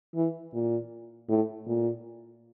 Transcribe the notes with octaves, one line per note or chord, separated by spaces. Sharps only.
E3
A#2
A2
A#2